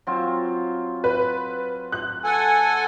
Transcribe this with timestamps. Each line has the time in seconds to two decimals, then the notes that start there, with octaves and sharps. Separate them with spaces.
0.07 F#3 C4 F4
1.04 B4
1.92 F#6
2.24 A4 F#5 G#5